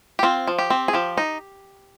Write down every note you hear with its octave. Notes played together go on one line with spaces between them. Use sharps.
G4
C4 F4
F3
G4
C4
G#4
F3 G4
D#4